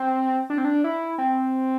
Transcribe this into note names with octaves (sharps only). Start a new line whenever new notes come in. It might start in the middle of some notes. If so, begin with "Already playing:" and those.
Already playing: C4
D4
C4
D4
E4
C4